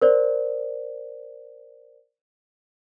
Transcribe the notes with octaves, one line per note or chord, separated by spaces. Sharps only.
A#4 C5 D5